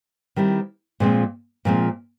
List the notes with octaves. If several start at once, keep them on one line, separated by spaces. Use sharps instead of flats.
D#3 G3 C4 E4
A#2 F3 G#3 C4
A#2 F3 G#3 C4